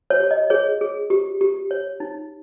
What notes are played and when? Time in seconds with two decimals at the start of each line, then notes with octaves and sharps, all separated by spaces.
0.10 C#5
0.20 G4
0.31 D#5
0.50 G#4 C#5
0.81 G#4
1.10 G4
1.41 G4
1.71 C#5
2.00 D#4